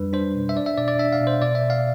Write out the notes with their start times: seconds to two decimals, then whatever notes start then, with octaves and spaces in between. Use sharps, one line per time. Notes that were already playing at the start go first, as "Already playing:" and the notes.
Already playing: F2 G3 D4 B4
0.13 D4 C5
0.35 B2
0.49 E5
0.56 D4 D5
0.66 E5
0.77 B2 D5
0.88 D5
0.99 D4 E5
1.13 F5
1.21 B2
1.27 C5
1.41 B2 D5
1.55 E5
1.63 B2
1.70 F5